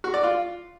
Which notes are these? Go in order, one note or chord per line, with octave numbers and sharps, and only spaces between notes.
F#4
D5
F4